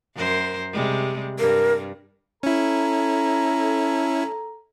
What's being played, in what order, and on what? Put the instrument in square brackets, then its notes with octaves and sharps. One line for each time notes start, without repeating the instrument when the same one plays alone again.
[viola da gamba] F#2 A#4 C5
C3 G3 G#3
[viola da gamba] G2 [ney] A#4
[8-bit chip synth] C#4 E4 [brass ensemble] A4 A#5